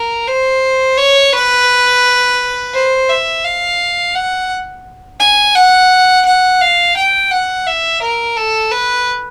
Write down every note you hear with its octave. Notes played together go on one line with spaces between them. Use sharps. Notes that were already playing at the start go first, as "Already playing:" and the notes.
Already playing: A#4
C5
C#5
B4
C5
E5
F5
F#5
G#5
F#5
F#5
F5
G5
F#5
E5
A#4
A4
B4